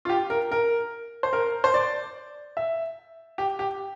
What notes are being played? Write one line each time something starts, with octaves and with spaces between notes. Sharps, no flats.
F4
G4
A#4
A#4
C5
A#4
C5
D5
E5
G4
G4